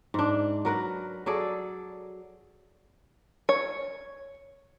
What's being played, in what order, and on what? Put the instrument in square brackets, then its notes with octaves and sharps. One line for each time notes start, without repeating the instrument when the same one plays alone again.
[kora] G#2 D4
F#3 A#4 B4
F#3 G#4 A4 D5
[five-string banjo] C#5